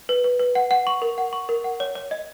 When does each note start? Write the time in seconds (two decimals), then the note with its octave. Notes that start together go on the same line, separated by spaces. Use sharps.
0.09 B4
0.24 B4
0.39 B4
0.55 F#5
0.71 F#5
0.87 C#6
1.02 A#4
1.18 F#5
1.33 C#6
1.49 A#4
1.64 F#5
1.80 C#5
1.95 C#5
2.11 D#5